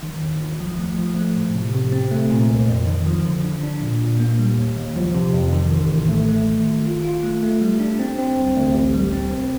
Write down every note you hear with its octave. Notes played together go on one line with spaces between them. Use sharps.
D#3
D#2
G1
F3
A3
F3
A3
A2
C3
C3
C4
A3
A#2
C2
F2
D#3
F3
D3
D4
D4
A#2
A#2
A#3
G3
D#2
D#2
F3
C3
F2
D#3
A1
A1
A3
A3
D#3
G1
F4
F4
A3
A3
G3
D4
C4
C4
D2
D2
A1
G3
C4
C2